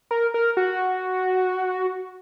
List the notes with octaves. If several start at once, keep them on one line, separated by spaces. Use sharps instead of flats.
A#4
A#4
F#4